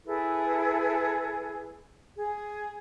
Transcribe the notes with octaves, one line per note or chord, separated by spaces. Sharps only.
E4 G#4 A4 B4
G#4